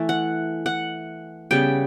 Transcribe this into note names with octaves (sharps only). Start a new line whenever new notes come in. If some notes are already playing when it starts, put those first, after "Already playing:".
Already playing: E3 A3
F#5
F#5
C#3 G3 B3 G5